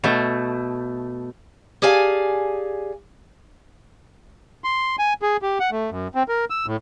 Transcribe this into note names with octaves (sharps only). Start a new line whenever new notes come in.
B2 A3
G4 G#4 D5 F5 G#5 A5
C6
G#5
G#4
G4
F#5
A3
F#2
C4
A#4
E6
A2